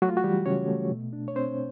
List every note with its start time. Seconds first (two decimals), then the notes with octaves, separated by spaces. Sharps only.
0.02 F#3 A3 F#4
0.09 F4
0.17 F#4
0.24 E3 G3 G4
0.46 C#3 C#4 C#5
0.68 A3
0.91 B2
1.13 D4
1.28 C#5
1.35 C4 D4 C5